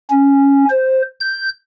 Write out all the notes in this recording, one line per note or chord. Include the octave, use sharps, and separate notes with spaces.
C#4
C5
G6